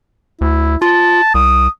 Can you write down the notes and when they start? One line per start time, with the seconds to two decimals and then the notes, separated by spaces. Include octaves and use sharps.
0.41 D2 E4
0.82 F4 A5
1.35 C2 D#6